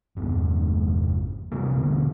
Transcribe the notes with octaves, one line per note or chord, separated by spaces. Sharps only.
G1 E2 G2
C3 G3 A#3
D#1 B2 D3